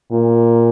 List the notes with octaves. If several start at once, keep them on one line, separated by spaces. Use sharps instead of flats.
A#2